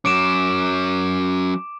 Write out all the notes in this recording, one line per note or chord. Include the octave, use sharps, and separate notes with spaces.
F#3 C#4 D6 D7 E7